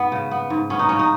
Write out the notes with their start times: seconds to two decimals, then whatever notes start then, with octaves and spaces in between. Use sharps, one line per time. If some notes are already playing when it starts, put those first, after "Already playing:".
Already playing: G#2 B3
0.12 C#3
0.31 B3
0.50 G#2
0.70 B3 C#4
0.79 D#4
0.89 C#3 C#4
0.99 D#4